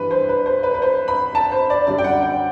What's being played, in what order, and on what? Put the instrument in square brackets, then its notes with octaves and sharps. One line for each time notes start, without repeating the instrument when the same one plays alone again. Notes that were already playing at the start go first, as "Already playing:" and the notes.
Already playing: [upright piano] G2 E3 G3 B4
C5
B4
C5
B4
B4
C5
B5
A5
C5
D5
F#2 D3 G3 D5
G5
F#5
G5